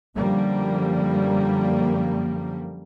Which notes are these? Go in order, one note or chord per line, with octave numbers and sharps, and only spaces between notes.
F#2 D3 F3 G3 A#3